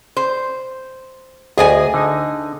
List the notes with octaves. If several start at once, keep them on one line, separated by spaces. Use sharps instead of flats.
C5
D2 G#4 D#5 G#5
D3 D#4